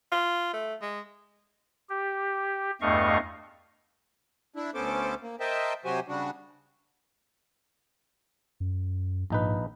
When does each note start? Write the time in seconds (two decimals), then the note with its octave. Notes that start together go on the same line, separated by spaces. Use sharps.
0.12 F4
0.53 A3
0.82 G#3
1.90 G4
2.81 E2 G2 A3 D#5 F5 C#6
4.56 D4 E4
4.74 D2 B3 C#4 A4 C5 D6
5.22 A#3
5.40 A#4 C5 D#5 E5 G5 A5
5.85 C3 F#3 F#4 G4 C5 G#5
6.08 C#3 G3 D4 F#4
8.60 F#2
9.30 A#1 G#2 D#4 B4